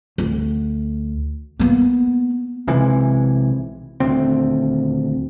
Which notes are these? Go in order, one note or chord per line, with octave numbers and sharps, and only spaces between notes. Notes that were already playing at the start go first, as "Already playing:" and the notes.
D2
A#3 B3
B1 C3 E3 G#3
D#1 D2 C4